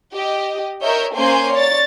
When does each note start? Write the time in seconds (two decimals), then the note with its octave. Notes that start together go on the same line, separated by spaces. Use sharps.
0.14 G4 D#5
0.82 A#4 C#5 D#5 E5 G6
1.14 A#3 C#4 C5 G#5 C6 G6
1.52 C#5 D5 A6